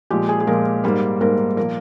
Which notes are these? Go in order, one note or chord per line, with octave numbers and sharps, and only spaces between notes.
A#2 F3 G#3 G4
G#4
G#4
A#2 F3 G#3 A#4
G#2 G3 A#3
G#2 G3 A#3 A#4
A#2 F3 A#3 A#4